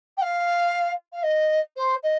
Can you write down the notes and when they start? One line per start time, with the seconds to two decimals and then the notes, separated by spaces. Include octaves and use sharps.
0.18 G5
0.22 F5
1.13 F5
1.23 D#5
1.77 C5
2.03 D#5